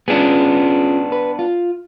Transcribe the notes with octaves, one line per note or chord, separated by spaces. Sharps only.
B3 C#4 D4 F4 G#4
B4
F4